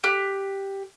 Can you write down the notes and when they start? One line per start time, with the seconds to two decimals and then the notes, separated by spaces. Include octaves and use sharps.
0.04 G4 F#6